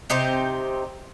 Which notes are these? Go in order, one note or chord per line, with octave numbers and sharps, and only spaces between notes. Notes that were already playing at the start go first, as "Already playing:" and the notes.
C3 D#4 G4 C5